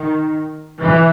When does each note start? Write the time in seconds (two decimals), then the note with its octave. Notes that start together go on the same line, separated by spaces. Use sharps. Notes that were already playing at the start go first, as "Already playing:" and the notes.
Already playing: D#3
0.82 E3